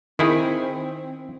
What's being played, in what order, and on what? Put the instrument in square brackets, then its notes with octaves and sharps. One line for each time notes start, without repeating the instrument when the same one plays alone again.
[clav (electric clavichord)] D#3 E4 G#4 [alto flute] C4